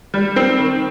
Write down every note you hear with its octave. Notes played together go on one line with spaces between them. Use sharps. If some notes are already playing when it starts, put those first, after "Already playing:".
G3
C4
D#3